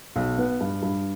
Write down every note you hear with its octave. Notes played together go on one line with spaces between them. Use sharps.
B1
B3
G2
G2